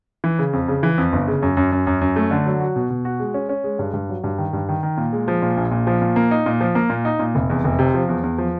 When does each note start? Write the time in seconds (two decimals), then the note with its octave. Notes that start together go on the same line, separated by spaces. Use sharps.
0.24 E3
0.39 C#3
0.53 F2
0.68 C#3
0.83 E3
0.98 F2
1.12 G1
1.27 C#3
1.42 F#2
1.57 F#2
1.72 F#2
1.87 F#2
2.01 F#2
2.16 A3
2.31 D3
2.46 F#3
2.60 F#4
2.76 B2
2.90 B2
3.05 F#4
3.19 G#3
3.34 C#4
3.49 C#4
3.64 G#3
3.79 G2
3.94 G2
4.09 F#3
4.24 G2
4.38 D#3
4.53 G2
4.69 D#3
4.83 D#3
4.97 A#2
5.13 G#3
5.28 F3
5.42 A#2
5.57 A#1
5.71 A#2
5.87 F3
6.02 A#2
6.16 A#3
6.31 D#4
6.46 A#2
6.61 F3
6.75 A#3
6.90 A#2
7.05 D#4
7.19 A#2
7.35 F1
7.50 E2
7.64 F1
7.79 C3
7.94 F3
8.09 E2
8.24 E2
8.38 F3